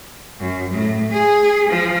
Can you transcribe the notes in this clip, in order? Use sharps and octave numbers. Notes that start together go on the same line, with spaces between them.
F#2
A2
G#4
F3